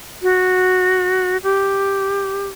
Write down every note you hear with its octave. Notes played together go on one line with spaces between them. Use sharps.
F#4
G4